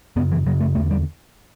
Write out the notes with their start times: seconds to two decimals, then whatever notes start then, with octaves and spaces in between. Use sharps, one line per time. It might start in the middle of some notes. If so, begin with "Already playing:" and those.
0.16 F#2 C#3 B3
0.32 E3
0.46 F#2 C#3 F#3
0.61 A3
0.75 E2 D3 A3
0.91 G3